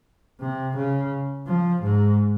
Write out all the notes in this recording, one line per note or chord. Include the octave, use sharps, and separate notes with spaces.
C3
C#3
F3
G#2